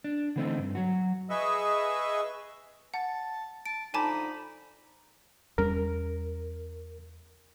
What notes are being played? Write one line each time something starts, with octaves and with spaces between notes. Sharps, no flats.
D4
D3 E3 A3 C4 D#4
G2
F#3 F#4
G#4 B4 D#5 E5 C#6 E6
F#5 A5
A5 D7
D3 F3 D#4 G#5 A5 B5 D6
E2 G3 C#4 A#4